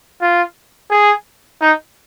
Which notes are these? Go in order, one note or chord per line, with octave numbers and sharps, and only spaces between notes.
F4
G#4
D#4